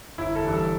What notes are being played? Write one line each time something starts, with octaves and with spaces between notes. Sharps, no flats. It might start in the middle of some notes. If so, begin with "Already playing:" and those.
G1 E4
A4
G2 E3
A4